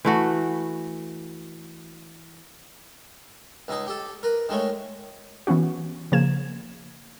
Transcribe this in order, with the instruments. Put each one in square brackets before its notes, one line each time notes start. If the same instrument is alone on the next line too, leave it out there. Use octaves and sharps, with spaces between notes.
[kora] E3 A3 F#4
[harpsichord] C#2 D#4 G#4
G4 A4
A#4 B4
D#3 G#3 A3 C#5
[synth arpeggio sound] E3 B3 C#4 F#4
C#3 F3 A#3 G#6 E7